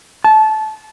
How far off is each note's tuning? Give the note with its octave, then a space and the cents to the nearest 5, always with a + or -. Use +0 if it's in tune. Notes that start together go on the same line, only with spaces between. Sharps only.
A5 -20